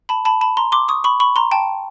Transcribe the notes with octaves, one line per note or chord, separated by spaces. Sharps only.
A5 B5
A5 B5
A5 B5
A#5 C6
C6 D6
C#6 D#6
B5 C#6
B5 C#6
A#5 C6
G5 A5